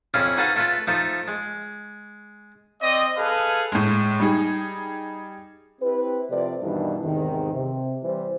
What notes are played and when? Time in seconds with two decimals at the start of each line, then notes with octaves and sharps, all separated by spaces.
0.14 F2 C#4 E4 G#4 F5
0.37 D#4 F#4 G#4 A4 B4 F5
0.56 A3 F4 B4
0.87 F3 A3 D#4
1.28 G#3
2.81 C4 D5 D#5
3.16 G#4 A4 B4 F5
3.72 A2 G#3
4.20 G3 D#4 G#4
5.81 C4 E4 G4 B4
6.30 C3 F3 A3 D5
6.61 G2 B2 D#3 E3 D4 E4
7.02 E2 G#2 C3 D#3
7.52 C3
8.03 E3 G3 E4 C5